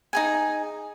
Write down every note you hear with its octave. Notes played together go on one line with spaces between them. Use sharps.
D#4 G#4 G#5